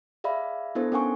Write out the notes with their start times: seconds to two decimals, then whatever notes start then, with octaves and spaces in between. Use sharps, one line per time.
0.24 G#4 D5 E5 F5 B5
0.75 B3 D4 E4 A4 C5
0.92 C#4 D4 A#4 F#5 G#5 C#6